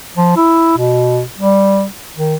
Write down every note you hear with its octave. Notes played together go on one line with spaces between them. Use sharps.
F3
E4
B2
G3
D#3